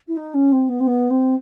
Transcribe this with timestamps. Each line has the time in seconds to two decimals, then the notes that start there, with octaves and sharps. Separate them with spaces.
0.07 E4
0.16 D#4
0.34 C#4
0.52 C4
0.68 B3
0.80 C4
0.86 B3
1.10 C4